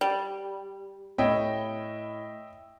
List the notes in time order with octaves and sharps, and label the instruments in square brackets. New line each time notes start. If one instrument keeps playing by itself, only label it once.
[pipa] G3
[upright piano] A2 C#5 B5 [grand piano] D#5 E5 G5